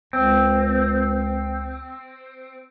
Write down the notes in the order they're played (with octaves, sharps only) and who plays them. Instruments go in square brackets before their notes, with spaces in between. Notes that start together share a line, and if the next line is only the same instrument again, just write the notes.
[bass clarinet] C#2 [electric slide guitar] C4